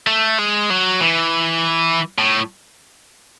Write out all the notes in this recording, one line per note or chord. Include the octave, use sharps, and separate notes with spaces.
A3
G#3
F#3
E3
A2